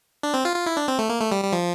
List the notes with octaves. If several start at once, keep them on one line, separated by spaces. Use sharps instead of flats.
D4
C4
F4
F4
E4
D4
C4
A3
A#3
A3
G3
G3
F3